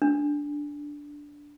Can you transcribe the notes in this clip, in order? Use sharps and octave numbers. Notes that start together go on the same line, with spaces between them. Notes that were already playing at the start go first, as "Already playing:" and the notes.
D4